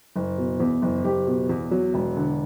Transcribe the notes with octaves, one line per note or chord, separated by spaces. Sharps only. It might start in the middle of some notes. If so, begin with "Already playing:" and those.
F#1
B2
E2
F#1
F#1 G4
B2
E2
F#3
E1
D3